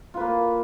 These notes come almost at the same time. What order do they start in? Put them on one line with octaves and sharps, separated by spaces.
F4 B4 A#3